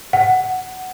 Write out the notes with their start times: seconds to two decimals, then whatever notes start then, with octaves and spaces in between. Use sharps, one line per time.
0.13 F#5